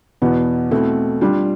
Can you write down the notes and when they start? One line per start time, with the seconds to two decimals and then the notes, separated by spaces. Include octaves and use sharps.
0.22 E2 B2 B3
0.71 B2 A3 C4 E4
1.21 G3 D4 F4